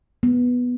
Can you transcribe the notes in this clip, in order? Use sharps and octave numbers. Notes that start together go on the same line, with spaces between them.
B3